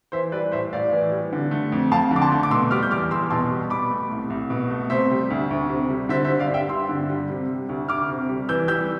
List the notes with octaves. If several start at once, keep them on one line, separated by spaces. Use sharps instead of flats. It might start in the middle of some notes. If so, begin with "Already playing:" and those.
E3 C5 E5
G3 B4 D5
A2 C5 E5
A2 D5 F5
E3
G3
D3
A3
F2
F2 F5 A5
D3
D6
A5 C6
A3
D6
B2 C6 E6
G3 D6 F6
G6
E2 D6 F6
E2 C6 E6
B2 A5 C6
G3
B2 B5 D6
A3
C2
C2
B2
A3
C3 C5 E5
G3
D2
D2
C3
G3
D3 C5 E5
C5 E5
G3
D5 F5
G2 E5 G5
G2 C6 E6
D3
G3
C3
G3
D2
D2 D6 F6
C3
G3
E3 E6 G6
G3 E6 G6